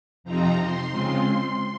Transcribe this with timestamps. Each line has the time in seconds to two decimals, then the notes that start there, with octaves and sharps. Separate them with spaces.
0.24 F2 C3 F3 C4 D#4 A#5
0.58 C6
0.91 C#3 G#3 C4 F4